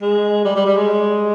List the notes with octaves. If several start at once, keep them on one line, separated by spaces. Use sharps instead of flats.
G#3
G3
G3
G3
G#3